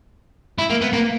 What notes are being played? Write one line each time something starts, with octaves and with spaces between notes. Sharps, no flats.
E4
A#3
B3
A#3